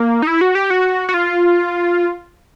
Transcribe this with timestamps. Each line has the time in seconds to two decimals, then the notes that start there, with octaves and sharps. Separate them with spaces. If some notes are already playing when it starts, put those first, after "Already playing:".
Already playing: A#3
0.22 D#4
0.27 E4
0.41 F#4
0.55 G4
0.70 F#4
1.09 F#4
1.14 F4